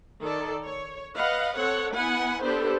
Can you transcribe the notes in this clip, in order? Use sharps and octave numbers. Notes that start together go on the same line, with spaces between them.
D#3 A4 D5
C#5
B4 D#5 F5 F#5
C4 A4 C#5 F#5
B3 E4 F#5 G#5 B5
B3 D4 G4 A4 B4 C5